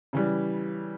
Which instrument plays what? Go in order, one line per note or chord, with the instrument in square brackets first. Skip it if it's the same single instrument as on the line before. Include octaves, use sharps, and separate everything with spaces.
[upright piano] C#3 E3 G3